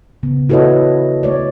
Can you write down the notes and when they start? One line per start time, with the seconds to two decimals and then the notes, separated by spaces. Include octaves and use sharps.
0.23 C#3 B3
0.49 E4 F#4 A4 B4 C#5 D#5
1.23 A3 C#5 D5